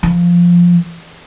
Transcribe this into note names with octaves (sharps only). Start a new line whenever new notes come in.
F3